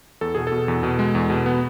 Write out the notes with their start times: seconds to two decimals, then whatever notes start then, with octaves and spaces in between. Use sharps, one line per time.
0.21 E2 A4
0.35 B2 G#4
0.47 B2 A4
0.68 E2
0.83 B2
0.99 G#3
1.15 E2
1.30 B2
1.46 B3